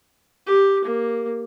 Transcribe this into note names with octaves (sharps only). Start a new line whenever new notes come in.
G4
A#3